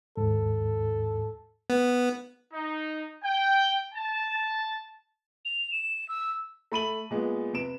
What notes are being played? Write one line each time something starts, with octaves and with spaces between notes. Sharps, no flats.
D#2 G#2 A4
B3
D#4
G5
A5
F7
E7
E6
A3 B5 D#7 F#7
A#2 G#3 B3
C3 B4 D7 E7